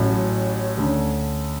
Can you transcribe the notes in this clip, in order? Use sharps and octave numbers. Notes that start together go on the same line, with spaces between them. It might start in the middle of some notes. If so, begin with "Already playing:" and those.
Already playing: A1 A2 F#3 C#4
D2 D3 A3 C#4